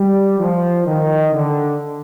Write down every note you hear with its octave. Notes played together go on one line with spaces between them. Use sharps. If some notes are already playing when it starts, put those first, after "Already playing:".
Already playing: G3
F3
D#3
D3